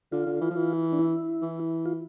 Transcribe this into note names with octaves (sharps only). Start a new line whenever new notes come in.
D3 F4
D3
E3
F3
E3
D4
E4
E3
F4